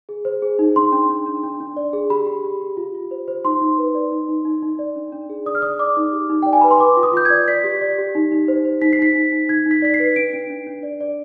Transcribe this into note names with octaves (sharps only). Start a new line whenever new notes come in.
G#4
C5
G#4
D#4
D4 C6
D4
D4
D4
D4
D4
D5
G#4
G4 B5
G4
G4
G4
F4
F4
C5
C5
D#4 C6
D#4
B4
D5
D#4
D#4
D#4
D#4
D5
D4
D4
G#4
D5 D#6
F6
D5 D#6
D5 D6
D#4
G4
D#4
D5 G5
G#5
B4 B5
C6
B4 D6
F4
D#6
F4 G6
D5 G#6
D5 B6
G4
D5
G4
D#4
D#4
C5
C5
D#4 B6
C7
D#4 B6
D#4
D#4
D#4 G#6
D#4 B6
D5 B6
C7
B4
D4 D7
D4
D4
D4
D5
D5